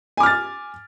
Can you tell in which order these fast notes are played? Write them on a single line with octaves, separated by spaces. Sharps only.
G#5 D6 F6 A6